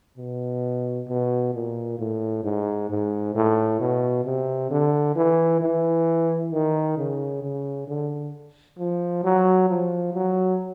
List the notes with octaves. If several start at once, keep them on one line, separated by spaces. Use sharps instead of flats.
B2
B2
A#2
A2
G#2
G#2
A2
B2
C3
D3
E3
E3
D#3
C#3
C#3
D3
F3
F#3
F3
F#3